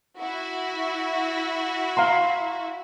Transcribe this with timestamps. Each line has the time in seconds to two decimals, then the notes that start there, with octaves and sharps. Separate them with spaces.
0.19 E4 F#4
1.97 F5 A#5 C6